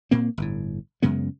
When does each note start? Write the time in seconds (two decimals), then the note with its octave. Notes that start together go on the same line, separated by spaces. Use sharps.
0.11 A#2 A#3 C4
0.38 G1 A2
1.02 F#2 C#3 G#3 B3